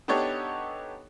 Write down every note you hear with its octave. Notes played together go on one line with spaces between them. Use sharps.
B3 D4 D#4 G4 A4 C#5